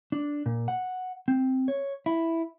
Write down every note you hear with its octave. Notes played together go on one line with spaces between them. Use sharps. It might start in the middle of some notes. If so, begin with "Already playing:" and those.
D4
A#2
F#5
C4
C#5
E4